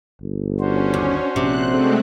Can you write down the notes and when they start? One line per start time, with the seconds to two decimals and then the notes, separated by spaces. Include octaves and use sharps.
0.21 G1
0.60 C#4 D4 F#4 C5
0.94 D#2
1.36 A#1 C3 F#6
1.67 G#3 A3 C4